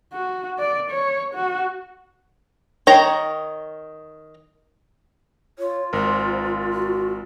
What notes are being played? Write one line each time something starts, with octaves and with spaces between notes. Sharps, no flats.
F#4
D5
C#5
F#4
D#3 C#5 A#5
F4 C#5
G#1 A#4 C5
F#4